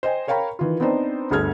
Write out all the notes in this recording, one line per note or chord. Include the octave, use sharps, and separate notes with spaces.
C5 D#5 G5 G#5
A#4 C#5 F5 G5 A#5 B5
D#3 E3 F4
B3 C4 D4 D#4 C5
G1 D2 G#4 A4 F6 G#6